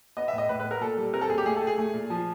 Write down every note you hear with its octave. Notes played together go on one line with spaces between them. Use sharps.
B3 D#5
E5
A2 D#5
A2 B4
B4
B3
A#4
A#2 A4
G3
C4 A#4
A4
A#2 G#4
G4
A3 G#4
A4
A3
G#4
A3
A#2
F3